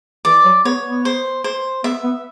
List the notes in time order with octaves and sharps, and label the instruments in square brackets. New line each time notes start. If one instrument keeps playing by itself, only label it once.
[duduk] E3 [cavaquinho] D5
[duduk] F#3
[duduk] B3 [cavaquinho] C#5
[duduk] B3
[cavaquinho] C5
C5
[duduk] B3 [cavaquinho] E5
[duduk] B3